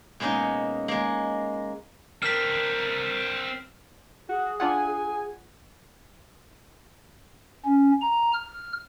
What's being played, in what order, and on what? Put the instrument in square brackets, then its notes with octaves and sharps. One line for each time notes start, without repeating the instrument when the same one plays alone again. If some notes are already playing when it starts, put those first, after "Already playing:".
[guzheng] B2 G#3 A#3 C#4 D#4
G#3 A#3
[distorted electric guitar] C4 D4 [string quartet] A#4 [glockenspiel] F6 B6
[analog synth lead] F#4 [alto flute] G#4
[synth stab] D4 F4 F#5 [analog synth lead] G#5
[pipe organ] C#4
A#5
F6